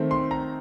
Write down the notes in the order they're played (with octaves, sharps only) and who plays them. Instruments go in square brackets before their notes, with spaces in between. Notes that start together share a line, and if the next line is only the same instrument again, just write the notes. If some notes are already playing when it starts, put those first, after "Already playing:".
Already playing: [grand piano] D#3 A3 C4
C6
A#5